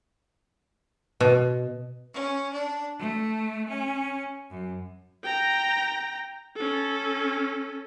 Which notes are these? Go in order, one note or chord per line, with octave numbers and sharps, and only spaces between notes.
B2
C#4
D4
A3
C#4
F#2
G5 A#5
C#4 A4